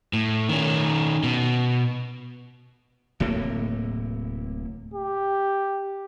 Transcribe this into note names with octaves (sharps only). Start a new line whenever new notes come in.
A2
D#3 C#4
B2
D1 A2 C3 A#3
G4